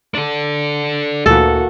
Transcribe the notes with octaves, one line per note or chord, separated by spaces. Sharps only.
D4 A4
D2 A#2 E3 A#3 F#4 A4